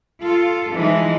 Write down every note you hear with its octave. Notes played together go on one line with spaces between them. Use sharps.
F4 A4
E3 F3 G#3 D#4